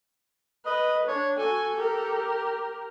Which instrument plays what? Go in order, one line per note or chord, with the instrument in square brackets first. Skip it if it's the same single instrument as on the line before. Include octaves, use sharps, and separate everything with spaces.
[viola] B4 [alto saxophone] D#5
[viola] D4 [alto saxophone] C#5
[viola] F#4 G#5 [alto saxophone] A4
[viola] G4 A#4